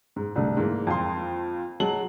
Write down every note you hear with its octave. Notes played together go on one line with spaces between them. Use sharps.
G#2
C2 D3 A3
G#2 E3 A#3
F2 F4 C6
F#3 G#3 A5 F#7